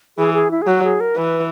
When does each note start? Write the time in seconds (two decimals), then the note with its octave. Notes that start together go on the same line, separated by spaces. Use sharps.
0.18 E3 G#4
0.34 G#4
0.51 E4
0.62 G#4
0.67 F#3 F#4
0.83 G#4
1.00 A#4
1.16 E3 B4